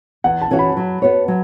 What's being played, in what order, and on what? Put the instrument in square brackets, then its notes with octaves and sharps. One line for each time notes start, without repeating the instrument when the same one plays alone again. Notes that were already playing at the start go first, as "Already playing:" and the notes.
[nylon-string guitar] E2 [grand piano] F#5
[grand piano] A5
[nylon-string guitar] E3 C#4 F#4
[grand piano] B5
[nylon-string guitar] F#3
B3 F#4 C#5
F#3